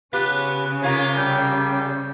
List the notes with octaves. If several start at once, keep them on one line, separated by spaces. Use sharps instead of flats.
C#3 B3 C#4 F4 G4 B4
C3 F4 A#4 C#5
G3 G5